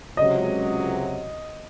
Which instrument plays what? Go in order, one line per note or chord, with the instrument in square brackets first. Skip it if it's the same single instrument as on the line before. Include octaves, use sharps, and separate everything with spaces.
[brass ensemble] C#2 C3 F#3 [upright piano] D#5